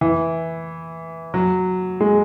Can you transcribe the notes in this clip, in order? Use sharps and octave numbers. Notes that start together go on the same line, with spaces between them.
E3
F#3
G#3